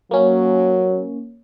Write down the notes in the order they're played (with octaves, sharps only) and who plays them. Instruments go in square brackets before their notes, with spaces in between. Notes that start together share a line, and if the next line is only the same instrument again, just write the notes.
[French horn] F#3 [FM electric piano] A#3 C#4